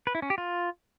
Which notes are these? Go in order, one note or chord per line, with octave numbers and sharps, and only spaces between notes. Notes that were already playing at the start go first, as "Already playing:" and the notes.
B4
E4
C#4
G4
F4